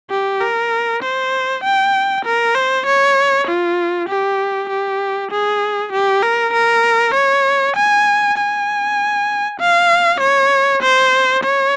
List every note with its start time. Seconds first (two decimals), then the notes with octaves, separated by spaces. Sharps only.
0.10 G4
0.41 A#4
1.03 C5
1.63 G5
2.25 A#4
2.55 C5
2.86 C#5
3.47 F4
4.09 G4
4.69 G4
5.31 G#4
5.93 G4
6.23 A#4
6.54 A#4
7.14 C#5
7.76 G#5
8.38 G#5
9.60 F5
10.21 C#5
10.82 C5
11.43 C#5